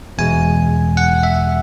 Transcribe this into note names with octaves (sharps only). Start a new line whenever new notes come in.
E2 B2 G#3 G#5
F#5
E5